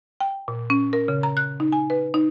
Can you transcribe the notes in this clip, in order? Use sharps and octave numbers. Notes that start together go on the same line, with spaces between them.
G5
A#2
C#4
A#4
C#3
A#5
F#6
D#4
G#5
B4
D#4